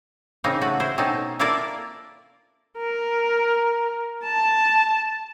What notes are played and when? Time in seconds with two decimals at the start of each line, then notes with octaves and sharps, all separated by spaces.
0.44 C#3 A#3 C4 D#4
0.61 A3 F#4 B4
0.80 E4 C5
0.98 B2 C4 C#4 D#4 A4
1.39 A#3 E4 F4 A4 A#4 D5
2.78 A#4
4.23 A5